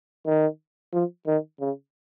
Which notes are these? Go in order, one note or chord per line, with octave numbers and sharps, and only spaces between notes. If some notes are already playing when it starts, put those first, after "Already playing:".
D#3
F3
D#3
C#3